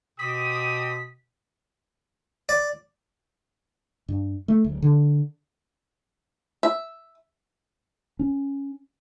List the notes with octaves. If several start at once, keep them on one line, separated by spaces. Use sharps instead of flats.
B2 C4 G4 D#6 B6
D5
G2
A3
D1
D3
E5
C#4